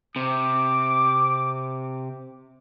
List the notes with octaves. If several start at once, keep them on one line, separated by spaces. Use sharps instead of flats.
C3 D6